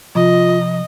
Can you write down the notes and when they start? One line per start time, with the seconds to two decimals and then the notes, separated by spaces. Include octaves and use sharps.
0.15 C3 F3 F4 D#5